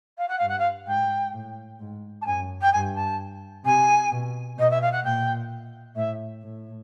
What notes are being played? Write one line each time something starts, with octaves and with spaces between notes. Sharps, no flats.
F5
F#5
G2 F5
F#5
F5
G#2 G5
A2
G#2
A5
F#2 G#5
G5
G2 G#5
A5
C3 G#5
B2
B2 D#5
E5
F5
F#5
A#2 G5
A2 E5
A2